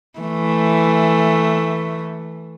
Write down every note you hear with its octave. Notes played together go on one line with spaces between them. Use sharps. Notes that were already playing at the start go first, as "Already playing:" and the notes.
E3 A3